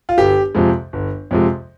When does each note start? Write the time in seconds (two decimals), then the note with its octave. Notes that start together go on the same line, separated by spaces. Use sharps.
0.09 F4
0.18 G1 G4
0.55 F2 C3 F3 G#3
0.93 G1
1.31 F2 C3 F3 G#3